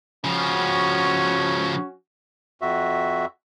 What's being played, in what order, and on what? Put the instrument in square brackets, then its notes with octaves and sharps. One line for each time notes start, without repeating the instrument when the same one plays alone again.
[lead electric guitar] C#3 F3 [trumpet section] C#4 F#4
[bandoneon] F2 F#4 E5